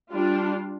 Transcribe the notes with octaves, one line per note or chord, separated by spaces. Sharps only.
G3 D4 F4